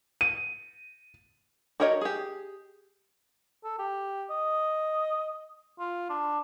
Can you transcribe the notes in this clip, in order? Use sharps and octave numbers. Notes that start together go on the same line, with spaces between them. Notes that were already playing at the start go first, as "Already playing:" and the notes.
D#7
F#4 G4 A#4 C#5 D#5
G4 G#4
A4
G4
D#5
F4
D4